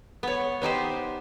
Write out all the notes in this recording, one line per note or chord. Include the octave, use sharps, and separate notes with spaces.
B3 C#5
B3 D#4 G4 C5